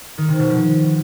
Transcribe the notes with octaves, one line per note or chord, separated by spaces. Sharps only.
D#3
C3
B2
F3